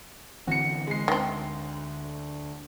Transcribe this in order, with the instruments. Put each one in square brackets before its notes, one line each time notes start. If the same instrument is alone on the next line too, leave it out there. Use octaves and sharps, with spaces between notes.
[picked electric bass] D3 E3 C4 [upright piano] F#4 C#7
[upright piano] G#3 C7
[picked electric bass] D2 [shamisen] D#3 C4